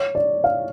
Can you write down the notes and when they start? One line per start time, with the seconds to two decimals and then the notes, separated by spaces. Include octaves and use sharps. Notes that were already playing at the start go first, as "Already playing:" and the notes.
Already playing: C#5
0.15 D5
0.44 F5